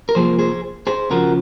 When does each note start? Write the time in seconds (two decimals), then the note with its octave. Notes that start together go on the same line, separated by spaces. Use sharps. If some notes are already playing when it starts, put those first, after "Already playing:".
0.09 A#4
0.15 C2 C3 F3 A#3 G#4 C5
0.39 G#4 C5
0.87 G#4 C5
1.11 C#2 C#3 F3 F#4 A#4